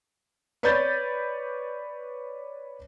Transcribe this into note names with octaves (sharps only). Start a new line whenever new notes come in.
B4 C#5 D5 B5 G6 A6